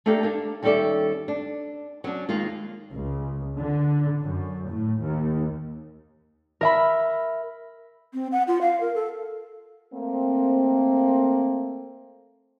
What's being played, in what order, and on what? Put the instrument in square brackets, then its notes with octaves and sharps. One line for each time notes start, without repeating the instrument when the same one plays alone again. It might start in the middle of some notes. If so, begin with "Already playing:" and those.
[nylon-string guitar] A3 A#3 D4 G4 A4 A#4
A#3 D4
D#2 G3 C#4 A4 D5 E5
D4
F#3 C#4 D4
D#2 G#3 A#3 F4
[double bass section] C#2
D3
F#2
A2
D#2
[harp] A#4 E5 B5
[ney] C4
F#5
F4
F5
A#4
A4
[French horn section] A3 A#3 C4